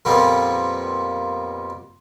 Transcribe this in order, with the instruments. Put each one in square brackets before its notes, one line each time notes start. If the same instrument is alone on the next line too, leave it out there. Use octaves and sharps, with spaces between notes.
[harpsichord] F2 A#2 F3 G3 B3 C4